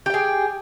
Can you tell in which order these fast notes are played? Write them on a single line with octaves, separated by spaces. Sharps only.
G4 G5 G#4